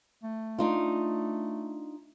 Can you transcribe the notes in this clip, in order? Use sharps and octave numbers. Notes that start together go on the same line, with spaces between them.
A3
D4 D#4 F4